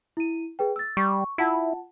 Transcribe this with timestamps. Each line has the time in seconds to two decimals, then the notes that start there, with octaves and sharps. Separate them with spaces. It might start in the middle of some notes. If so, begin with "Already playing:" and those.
0.17 E4 D#7
0.59 G#4 B4 G5
0.76 E6 A6
0.97 G3 C#6
1.38 E4 F4 F#5 A5